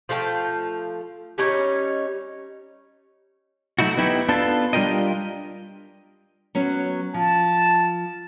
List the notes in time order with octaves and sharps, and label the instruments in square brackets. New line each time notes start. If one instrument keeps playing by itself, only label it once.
[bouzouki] F3 A3 F5 G5
G3 C#4 D#4 C#5
[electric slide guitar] F#3 A3 D#4 E4 F#4
B3 D#4 E4 G4
B3 D4 F4 A4
G3 D4 F4 G4 A#4 D#5
[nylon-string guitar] F#3 B3 C#4
[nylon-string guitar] F3 [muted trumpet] A5